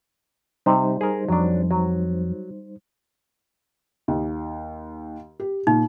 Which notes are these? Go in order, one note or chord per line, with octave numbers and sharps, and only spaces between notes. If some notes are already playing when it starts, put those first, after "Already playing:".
C3 G3 D#4 C5
G#4 A#4
F2 F#3 D4
F#3
D#2
G4
A#2 D#4